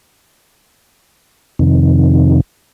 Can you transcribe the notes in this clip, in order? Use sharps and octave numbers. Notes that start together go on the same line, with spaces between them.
F2 C3 D#3